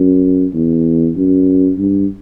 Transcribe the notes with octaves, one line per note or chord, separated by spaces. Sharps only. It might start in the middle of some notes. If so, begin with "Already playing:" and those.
Already playing: F#2
E2
F#2
G2